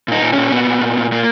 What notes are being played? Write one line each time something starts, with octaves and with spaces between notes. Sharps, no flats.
A#2 D#4
A#2
A#2 C#4
A#2 B3
A#2
A#2
A#2
A#2 A#3